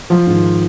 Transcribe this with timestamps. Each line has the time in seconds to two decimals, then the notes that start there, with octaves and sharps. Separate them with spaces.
0.10 F3 F4
0.27 G#2 D#3